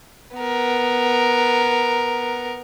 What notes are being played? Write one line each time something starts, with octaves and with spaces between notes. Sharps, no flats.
B3 A#4